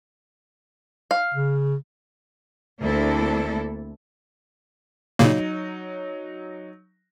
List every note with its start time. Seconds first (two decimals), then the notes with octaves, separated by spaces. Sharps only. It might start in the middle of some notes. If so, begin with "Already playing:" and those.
1.11 F5
1.34 C#3
2.79 D2 A#3 C4 D4 E4 A4
5.19 A#2 C#3 F#3 A#3 D#4